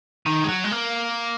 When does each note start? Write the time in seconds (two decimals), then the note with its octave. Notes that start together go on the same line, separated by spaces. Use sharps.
0.26 D#3
0.44 G#3
0.49 F#3
0.64 G#3
0.72 A#3